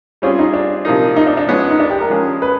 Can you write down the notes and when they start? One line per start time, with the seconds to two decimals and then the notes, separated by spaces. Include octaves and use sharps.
0.22 G3 C4 C#4 F4 G#4
0.39 D#4
0.54 D4
0.85 C3 F3 A#3 D#4
1.16 D#4
1.27 D4
1.37 D4
1.47 F3 G#3 B3 C#4
1.70 D#4
1.80 D4
1.90 G4
2.01 A#4
2.10 F3 G#3 C#4
2.42 B4